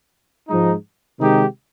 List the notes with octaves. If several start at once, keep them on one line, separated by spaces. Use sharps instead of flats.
G#2 F3 G#3 D#4
C3 D#3 G#3 D#4 G4